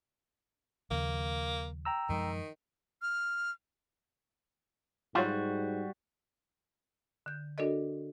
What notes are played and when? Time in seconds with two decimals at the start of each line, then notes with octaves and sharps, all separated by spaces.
0.91 D#2 C#3 F3 A#3
1.85 G5 A#5 E6
2.09 F#2 D#3 F3 G#3
3.02 F6
5.15 G#2 F#3 G3 F4 F#4
7.26 D3 G6
7.58 D4 F#4 A4 A#4 D5 D#5